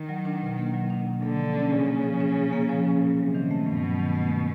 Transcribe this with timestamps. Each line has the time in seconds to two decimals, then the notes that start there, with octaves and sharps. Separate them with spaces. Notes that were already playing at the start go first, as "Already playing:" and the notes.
Already playing: D#3
0.09 F#3
0.25 D4
0.42 B2
0.58 A#3
0.74 F#3
0.90 D4
1.07 B2
1.23 D3 A#3
1.39 F3
1.55 C#4
1.71 A#2 C#3
1.88 A#3
2.04 F3
2.20 C#4
2.36 A#2
2.53 A#3
2.69 F3
2.85 C#4
3.01 A#2
3.17 C3 F#3
3.35 D#3
3.51 A3
3.66 G2 B2
3.83 F#3
3.99 D#3
4.15 A3